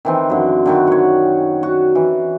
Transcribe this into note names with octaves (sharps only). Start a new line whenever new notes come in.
D#3 E3 C4
F#2 D3
D3 D#3 F#4
C#5 F#5
F#4
E3